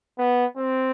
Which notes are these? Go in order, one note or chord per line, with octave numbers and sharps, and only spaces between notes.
B3
C4